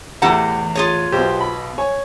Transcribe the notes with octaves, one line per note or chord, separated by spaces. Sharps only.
E2 A2 E3 G4 F#5 A#5 B5
F4 G#4 C#5
B1 B2 G4 C5
B5
C#5 G#5